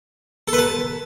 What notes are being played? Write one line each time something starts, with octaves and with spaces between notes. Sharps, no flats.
A4
B4
A5